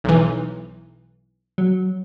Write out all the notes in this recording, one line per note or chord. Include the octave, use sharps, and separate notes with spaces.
B1 E3
F#3